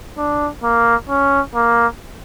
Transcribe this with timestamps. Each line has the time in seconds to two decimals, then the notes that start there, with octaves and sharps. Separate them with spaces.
0.18 D4
0.63 A#3
1.09 C#4
1.55 A#3